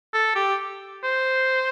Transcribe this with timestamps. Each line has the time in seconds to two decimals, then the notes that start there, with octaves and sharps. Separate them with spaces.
0.13 A4
0.35 G4
1.03 C5